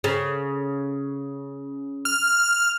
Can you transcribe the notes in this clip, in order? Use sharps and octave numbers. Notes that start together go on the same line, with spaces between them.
C#3
F6